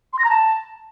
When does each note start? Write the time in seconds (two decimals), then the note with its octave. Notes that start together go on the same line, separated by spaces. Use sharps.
0.13 C6
0.19 A#6
0.24 A#5
0.30 A5